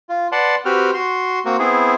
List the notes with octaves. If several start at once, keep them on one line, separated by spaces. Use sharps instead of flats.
F4
B4 D5 F#5 A5 C6
C4 F#4 G4 B4 F6
F#4 C6
A#3 C4 F#4
B3 C4 E4 G#4